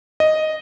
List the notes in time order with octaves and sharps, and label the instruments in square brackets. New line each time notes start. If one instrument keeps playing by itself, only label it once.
[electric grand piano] D#5